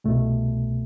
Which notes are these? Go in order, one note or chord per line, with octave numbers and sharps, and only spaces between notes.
C2 B2 A3